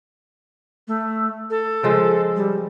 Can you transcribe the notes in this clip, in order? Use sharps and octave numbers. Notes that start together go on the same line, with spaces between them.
A3
A4
C#3 F3 G#3
G3